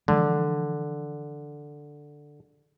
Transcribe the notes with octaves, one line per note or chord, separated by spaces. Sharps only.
D3 E3 F3 G#3